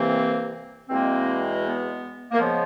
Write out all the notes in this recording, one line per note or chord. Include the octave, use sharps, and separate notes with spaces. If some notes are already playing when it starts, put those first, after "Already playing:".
Already playing: C2 C3 E3 A#3 C4
E2 B2 G#3 A#3 C4
B3
A#3
C#3 F3 G#3 B3